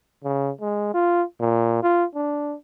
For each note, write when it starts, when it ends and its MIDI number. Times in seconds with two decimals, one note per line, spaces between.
0.24 0.50 49
0.61 0.93 56
0.94 1.23 65
1.40 1.78 46
1.83 2.05 65
2.15 2.55 62